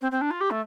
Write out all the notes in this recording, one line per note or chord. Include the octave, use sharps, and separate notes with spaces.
C4
C4
D4
F4
G4
A3